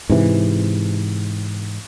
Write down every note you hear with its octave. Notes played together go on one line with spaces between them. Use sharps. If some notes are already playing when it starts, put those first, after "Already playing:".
G#2 C3 E3